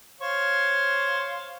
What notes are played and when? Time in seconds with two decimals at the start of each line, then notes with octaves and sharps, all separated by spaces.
0.21 C5 C#5 F5